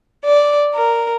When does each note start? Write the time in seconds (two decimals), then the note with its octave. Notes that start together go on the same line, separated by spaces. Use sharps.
0.25 D5
0.74 A#4